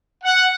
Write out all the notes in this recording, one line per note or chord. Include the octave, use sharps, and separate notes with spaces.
F#5